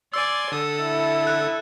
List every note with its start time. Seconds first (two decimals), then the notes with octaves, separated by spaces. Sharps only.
0.14 D5 G#5 C6 E6
0.52 D3 A4 D#6
0.83 E4
1.27 F#6